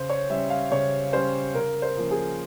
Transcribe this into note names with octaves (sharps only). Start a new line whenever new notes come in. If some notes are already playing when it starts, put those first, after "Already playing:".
Already playing: C#3 C5
C#5
G3 C#4 E5
F5
C#3 C#5
G3 C#4 C5
C#3 A#4
C5
F3 A#3 C#4
G#4